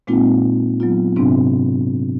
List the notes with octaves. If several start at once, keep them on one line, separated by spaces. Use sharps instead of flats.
A#2 G#3 A#3 C4 D#4 F4
F#3 B3 F4
G#2 C3 B3 C4 D4